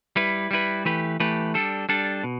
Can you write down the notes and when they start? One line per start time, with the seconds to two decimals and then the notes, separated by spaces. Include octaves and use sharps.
0.16 G3 E4 B4
0.51 G3 E4 B4
0.85 E3 A3 G4 B4
1.20 E3 A3 G4 B4
1.54 G3 D4 A4
1.89 G3 D4 A4
2.24 B2